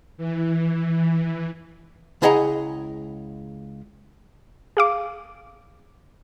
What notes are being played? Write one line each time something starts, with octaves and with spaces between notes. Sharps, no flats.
E3
C#2 E4 G#4 D#5 F#5 A#5
G#4 F5 D6